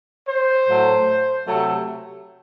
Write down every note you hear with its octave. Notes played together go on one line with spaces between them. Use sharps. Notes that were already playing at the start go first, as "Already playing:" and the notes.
C5
A2 F#3 A3
C3 F#3 A3